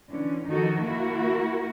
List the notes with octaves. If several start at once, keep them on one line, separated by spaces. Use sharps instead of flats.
D3 E3 C#4
D#3 F3 D#4 F#4 A4
A#3 E4 F#4 A#4